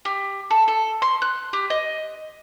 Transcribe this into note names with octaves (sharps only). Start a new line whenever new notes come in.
G4
A4
A4
C6
F#6
G4
D#5